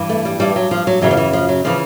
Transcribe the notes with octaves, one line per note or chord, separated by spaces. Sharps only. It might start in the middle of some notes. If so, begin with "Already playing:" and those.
Already playing: G2 E3
A3
G3
G2 E3 G3
F#3
F3
F#3
F#2 C#3 E3 F#3
F3
E3
F3
F#3
C#3 E3 F3